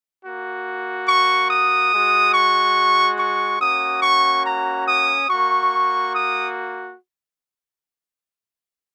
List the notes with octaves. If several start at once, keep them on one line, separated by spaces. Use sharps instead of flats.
A#3 F#4
C#6
D#6
G#3 F#4
C#6
C#6
A#3 C#4 F#4 D#6
C#6
A#5
D#6
A#3 F#4 C#6
D#6